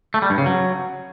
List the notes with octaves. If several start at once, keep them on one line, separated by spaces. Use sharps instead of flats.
A3
G3
G2
C#3
F#3